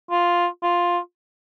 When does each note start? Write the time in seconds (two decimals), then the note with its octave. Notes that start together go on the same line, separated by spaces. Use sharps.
0.11 F4
0.63 F4